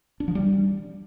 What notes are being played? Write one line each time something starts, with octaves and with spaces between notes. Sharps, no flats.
D4
F3
G3